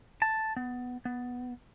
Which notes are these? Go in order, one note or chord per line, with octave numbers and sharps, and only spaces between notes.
A5
B3
B3